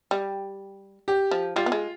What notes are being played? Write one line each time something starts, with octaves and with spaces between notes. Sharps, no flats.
G3
G4
F3
G3 F4
B3
G#3